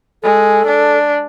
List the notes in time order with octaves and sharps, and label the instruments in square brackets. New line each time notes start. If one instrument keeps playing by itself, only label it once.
[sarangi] G#3 [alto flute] A4
[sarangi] D4